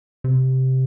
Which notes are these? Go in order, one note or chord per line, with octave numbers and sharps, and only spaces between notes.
C3